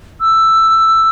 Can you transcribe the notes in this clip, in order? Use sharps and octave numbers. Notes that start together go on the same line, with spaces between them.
E6